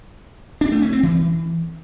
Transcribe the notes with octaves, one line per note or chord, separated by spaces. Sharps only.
D4
A3
C#4
C4
E3